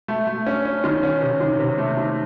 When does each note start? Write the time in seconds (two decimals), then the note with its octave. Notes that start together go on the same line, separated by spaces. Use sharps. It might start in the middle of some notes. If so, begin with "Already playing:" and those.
0.08 A3
0.27 A3
0.46 C#4
0.65 C#4
0.84 D#3
1.03 C#4
1.22 C3
1.41 D#3
1.59 C3
1.78 A3
1.97 D#3